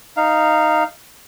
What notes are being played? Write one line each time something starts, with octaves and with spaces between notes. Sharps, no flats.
D#4 F5